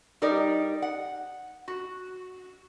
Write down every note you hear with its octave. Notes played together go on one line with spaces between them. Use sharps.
G3 D#4 A#4 D5
F#5
F#4